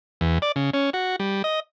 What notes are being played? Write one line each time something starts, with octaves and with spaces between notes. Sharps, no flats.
E2
D5
C#3
C#4
F#4
G3
D#5